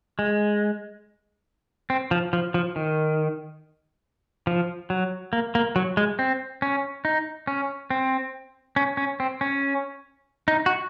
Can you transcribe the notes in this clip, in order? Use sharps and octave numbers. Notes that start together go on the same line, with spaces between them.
G#3
C4
F3
F3
F3
D#3
F3
F#3
A#3
A#3
F#3
G#3
C4
C#4
D#4
C#4
C4
C#4
C#4
C4
C#4
D#4
F#4